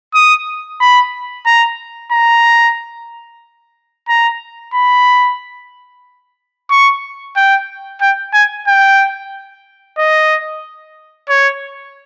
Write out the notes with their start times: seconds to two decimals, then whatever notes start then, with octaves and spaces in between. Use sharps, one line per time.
0.15 D#6
0.81 B5
1.46 A#5
2.12 A#5
4.08 A#5
4.74 B5
6.70 C#6
7.36 G5
8.01 G5
8.34 G#5
8.68 G5
9.98 D#5
11.29 C#5